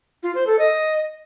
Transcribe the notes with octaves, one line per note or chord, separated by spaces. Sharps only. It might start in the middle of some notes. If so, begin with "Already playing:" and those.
F4
C5
A4
D#5